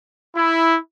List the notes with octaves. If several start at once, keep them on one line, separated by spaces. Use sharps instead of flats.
E4